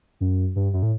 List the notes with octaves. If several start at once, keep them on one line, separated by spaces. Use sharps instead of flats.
F#2
G2
F#2
A2